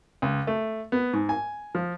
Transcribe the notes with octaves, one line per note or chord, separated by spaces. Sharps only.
C#2
A3
B3
G#2
G#5
F3